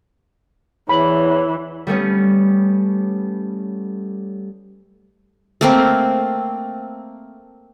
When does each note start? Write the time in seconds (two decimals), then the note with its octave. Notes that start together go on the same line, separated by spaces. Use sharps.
0.89 E2 E3 C#5 B5
1.87 G3 A3 B3 C#4
5.61 A3 A#3 C4